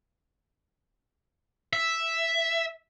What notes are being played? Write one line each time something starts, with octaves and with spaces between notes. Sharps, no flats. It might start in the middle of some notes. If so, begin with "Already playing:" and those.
E5